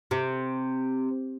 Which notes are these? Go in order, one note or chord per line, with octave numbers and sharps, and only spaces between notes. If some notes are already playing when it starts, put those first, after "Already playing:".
C3